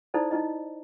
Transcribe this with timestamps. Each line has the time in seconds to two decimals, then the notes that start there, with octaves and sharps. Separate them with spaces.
0.14 D#4 E4 A4 C5 D5
0.31 D#4 E4 D#5